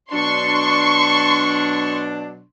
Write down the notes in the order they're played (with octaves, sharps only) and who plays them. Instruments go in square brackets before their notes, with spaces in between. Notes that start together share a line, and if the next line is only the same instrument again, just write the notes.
[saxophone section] B2 F#3 D4 [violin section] C6 C#6